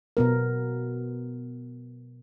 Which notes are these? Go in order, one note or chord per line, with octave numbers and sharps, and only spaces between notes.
B2 B3 A#4